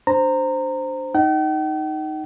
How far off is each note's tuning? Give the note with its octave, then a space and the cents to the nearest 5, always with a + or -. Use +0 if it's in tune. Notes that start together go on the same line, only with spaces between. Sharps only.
D4 +0 C5 +0 A#5 -15
D#4 +0 G5 -45